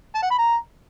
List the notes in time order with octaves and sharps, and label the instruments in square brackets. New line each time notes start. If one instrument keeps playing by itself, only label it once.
[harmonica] A5
F#5
B5
A#5